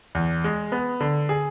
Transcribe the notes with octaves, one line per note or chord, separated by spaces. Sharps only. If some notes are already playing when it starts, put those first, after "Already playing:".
E2
G#3
B3
D3
G#4